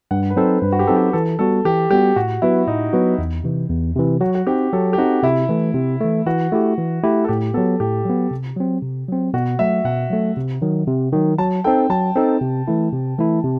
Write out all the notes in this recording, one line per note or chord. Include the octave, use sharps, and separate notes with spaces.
G2 F#5
B4
F#3 C4 D#4 A4 C5
G2 B4
F#4
G4
F#3 C4 D#4 A4
G4
E3 A4
G3 B3 F#4 A4
E3 G4
G3 B3 F#4 G4
A2 F#4
F#3 B3 E4 F#4 B4
A2 D#4
F#3 B3 F#4 B4
E2
C3 E3
E2
C3 E3
F#3 F#4
F#4
C4 D#4 G4
F#3 A4
G4
C4 D#4 F#4
C3 E4
E3 A3
C3
E3 A3
E3 F#4
A3 E4 G4
E3
A3 E4 G4
A4
A2 G4
F#3 B3 A4
A2 G4
F#3 B3
C3
F#3 C4
C3
F#3 C4
B2 F#4
F#3 A3 E5
B2 F#5
F#3 A3
C3
D#3 F#3
C3
D#3 F#3
F#3 A5
C4 D#4 A4 G5
F#3 A5
C4 D#4 A4
C3
E3 A3 E4
C3
E3 A3 E4
C3